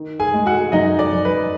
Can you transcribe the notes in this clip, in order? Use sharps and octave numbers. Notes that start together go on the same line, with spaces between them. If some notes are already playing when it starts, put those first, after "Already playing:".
Already playing: D#3
G#4 G#5
G#3
F#4 F#5
F#2 D#4 D#5
D5
F#2
B4